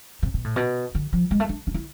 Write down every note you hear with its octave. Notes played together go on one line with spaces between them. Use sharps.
C3
B2
A2
B2
D3
F3
G#3
A3
D4
D4
E4